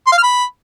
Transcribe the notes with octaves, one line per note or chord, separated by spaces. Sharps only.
C6
F5
F6
B5